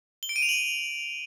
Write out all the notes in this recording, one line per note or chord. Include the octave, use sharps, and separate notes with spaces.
G7
D7
D#7
F7
F#7